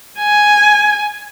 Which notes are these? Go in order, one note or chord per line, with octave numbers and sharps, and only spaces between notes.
G#5